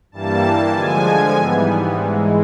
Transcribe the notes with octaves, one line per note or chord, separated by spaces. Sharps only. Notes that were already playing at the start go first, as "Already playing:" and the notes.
G2 E3 G3 A#3 A5
D3 F3 G#3 G#5
G#2 E3 G3 B3
G#2 E3 G#3